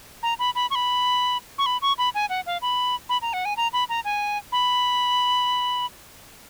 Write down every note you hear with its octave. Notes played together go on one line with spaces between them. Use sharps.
A#5
B5
B5
C#6
B5
C#6
B5
C#6
B5
G#5
F#5
F5
B5
B5
A#5
F#5
G#5
A#5
B5
A#5
G#5
B5